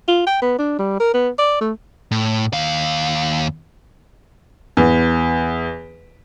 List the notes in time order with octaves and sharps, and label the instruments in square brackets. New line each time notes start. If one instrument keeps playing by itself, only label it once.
[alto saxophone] F4
G5
B3
D4
G3
A#4
B3
D5
A3
[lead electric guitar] A2
D#2 F5
[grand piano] E2